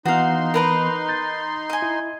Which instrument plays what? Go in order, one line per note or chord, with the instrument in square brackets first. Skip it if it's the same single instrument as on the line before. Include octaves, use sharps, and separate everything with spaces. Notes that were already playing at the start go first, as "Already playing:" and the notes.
[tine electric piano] E3 B3 [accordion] D#4 C6 [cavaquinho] F#4 F5
[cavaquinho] A#4 B4 A#5
[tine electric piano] G6 A6
[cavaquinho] D#5 G#5
[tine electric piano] E4